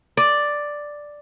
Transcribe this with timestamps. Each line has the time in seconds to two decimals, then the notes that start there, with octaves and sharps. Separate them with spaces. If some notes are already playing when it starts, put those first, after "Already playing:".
0.17 D5